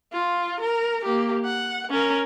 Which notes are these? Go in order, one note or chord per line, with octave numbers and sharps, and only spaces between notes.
F4
A#4
A#3 G4
F#5
C#4 A#4